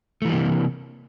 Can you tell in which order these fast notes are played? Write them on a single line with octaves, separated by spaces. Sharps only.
A3 E3 G3 A#3 C3